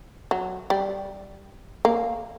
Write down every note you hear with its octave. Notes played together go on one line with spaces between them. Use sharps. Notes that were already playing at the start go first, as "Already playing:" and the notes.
F#3
G3
A#3